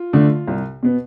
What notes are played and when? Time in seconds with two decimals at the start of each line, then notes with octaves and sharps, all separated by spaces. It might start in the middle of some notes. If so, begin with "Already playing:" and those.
Already playing: F4
0.13 D3 A3
0.48 C2
0.83 B2 B3